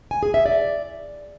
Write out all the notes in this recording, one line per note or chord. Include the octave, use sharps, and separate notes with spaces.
G#5
G#4
E5
D5